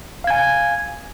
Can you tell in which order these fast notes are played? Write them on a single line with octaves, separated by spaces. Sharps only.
F5 G#6 G#5